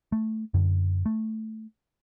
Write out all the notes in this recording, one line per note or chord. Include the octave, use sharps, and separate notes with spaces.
A3
F#2 D3
A3